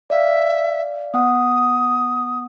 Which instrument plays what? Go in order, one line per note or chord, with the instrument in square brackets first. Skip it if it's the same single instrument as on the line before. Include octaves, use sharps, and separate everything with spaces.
[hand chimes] D5 F5 [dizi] E5
[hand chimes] B3 F#5 [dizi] D#6